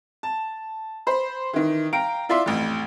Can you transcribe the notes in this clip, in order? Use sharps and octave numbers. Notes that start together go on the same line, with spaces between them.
A5
C5 B5
D#3 E3
F5 G5 A#5 D7
E4 F4 D5 E5 C6
A1 F2